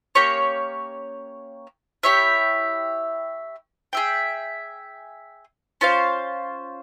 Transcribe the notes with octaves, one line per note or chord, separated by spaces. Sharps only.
A#3 C#4 G4 C#5
E4 G4 C#5 E5
G#4 E5 G5
C#4 F4 C5 F5